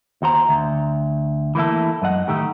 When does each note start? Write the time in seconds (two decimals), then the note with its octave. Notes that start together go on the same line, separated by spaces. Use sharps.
0.22 D#2 F#4 C5 A#5
0.49 D2
1.55 E3 A3 A#3 E4 A4
2.02 F#2 F#3 D#5 F#5
2.28 A2 D#3 A3 G4